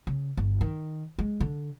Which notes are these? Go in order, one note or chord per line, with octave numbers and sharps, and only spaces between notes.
C#3
G1
D#3
G#3
D3